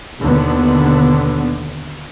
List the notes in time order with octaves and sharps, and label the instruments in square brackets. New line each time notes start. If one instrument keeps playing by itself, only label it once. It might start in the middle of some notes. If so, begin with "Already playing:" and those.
[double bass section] D#2 B2 D3 B3